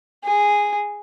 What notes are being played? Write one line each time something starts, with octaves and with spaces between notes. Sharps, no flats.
G#4